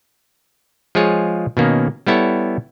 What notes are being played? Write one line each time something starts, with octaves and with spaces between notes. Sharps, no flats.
F3 G#3 F4 G#4 C#5
B2 D#3 A#3 C#4
G3 B3 E4 A4 C#5